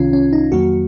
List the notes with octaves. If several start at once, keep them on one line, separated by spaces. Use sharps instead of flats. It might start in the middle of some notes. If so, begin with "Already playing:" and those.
Already playing: C2 C3 D#3 C#4 F4
C#4
D#4
F2 D#3 F#3 A#3 F#4